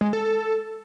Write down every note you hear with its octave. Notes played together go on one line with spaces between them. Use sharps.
G#3
A4
A4